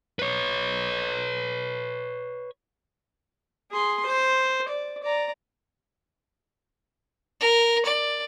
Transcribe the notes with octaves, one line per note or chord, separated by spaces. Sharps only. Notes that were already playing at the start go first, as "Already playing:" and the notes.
B4 C#5
G#4 C6
C5
D5
D5 A#5
A#4
D5